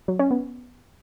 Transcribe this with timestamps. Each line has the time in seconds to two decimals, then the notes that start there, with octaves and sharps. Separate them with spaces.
0.08 F#3
0.19 C#4
0.31 B3